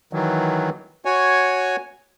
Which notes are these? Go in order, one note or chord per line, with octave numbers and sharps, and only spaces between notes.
D#3 E3 F#3
F#4 C#5 G#5